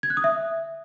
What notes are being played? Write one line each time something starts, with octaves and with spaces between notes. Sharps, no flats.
G#6
F#6
D#6
E5